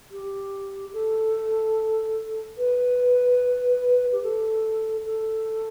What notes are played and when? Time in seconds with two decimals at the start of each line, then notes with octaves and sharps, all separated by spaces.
0.11 G4
0.93 A4
2.57 B4
4.12 G4
4.22 A4
5.05 A4